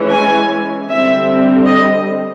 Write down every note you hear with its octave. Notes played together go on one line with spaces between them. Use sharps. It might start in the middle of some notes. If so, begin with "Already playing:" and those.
Already playing: E3 G#3 C#4
G#5
D3 G3 C4 E5
D#5